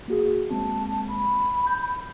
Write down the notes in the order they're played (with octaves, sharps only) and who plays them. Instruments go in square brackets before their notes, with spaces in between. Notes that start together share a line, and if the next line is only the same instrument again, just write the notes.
[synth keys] A#3 F#4 G#4
[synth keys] G#3 A#3 C4 [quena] A5
[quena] B5
[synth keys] G6